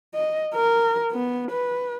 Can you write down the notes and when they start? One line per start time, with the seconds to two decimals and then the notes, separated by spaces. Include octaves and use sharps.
0.15 D#5
0.54 A#4
1.12 B3
1.51 B4